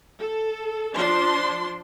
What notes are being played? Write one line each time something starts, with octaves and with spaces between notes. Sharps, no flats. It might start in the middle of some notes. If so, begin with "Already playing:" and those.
A4
F3 D4 C6